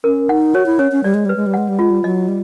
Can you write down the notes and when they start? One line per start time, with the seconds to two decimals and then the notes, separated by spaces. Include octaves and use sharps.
0.04 C#4 A#4
0.29 D#4 F#5
0.54 F#4 C#5
0.66 E4
0.79 C#4 C#5
0.92 C#4
1.04 G3 D5
1.14 G#3
1.25 G3 B4
1.36 G#3
1.46 G3
1.54 G#3 F#5
1.69 G3
1.79 G#3 F4
1.90 G3
2.04 F#3 D#5
2.28 G3